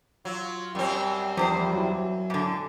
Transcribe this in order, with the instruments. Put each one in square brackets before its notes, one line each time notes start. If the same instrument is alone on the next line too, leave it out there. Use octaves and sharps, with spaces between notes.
[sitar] F#3 [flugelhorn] F4
[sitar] F#2 C4 [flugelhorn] G3
[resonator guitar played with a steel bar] E2 D4 C5 [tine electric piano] F3
[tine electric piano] F#3 E4
[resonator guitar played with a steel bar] G#2 D3